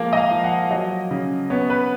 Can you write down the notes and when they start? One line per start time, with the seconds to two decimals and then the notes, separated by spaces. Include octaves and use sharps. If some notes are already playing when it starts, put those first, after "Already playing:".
Already playing: F3 G#3 A#3 F5
0.13 D#5
0.17 F5
0.31 F3
0.44 F#5
0.71 F#3 D#5
1.11 C#3
1.50 B3 C#5
1.70 B4